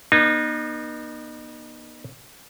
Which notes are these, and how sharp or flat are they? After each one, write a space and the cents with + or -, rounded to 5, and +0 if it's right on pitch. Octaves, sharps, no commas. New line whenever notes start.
B3 -45 D#4 -30